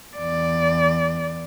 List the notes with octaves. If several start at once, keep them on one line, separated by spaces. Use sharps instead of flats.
E2 D5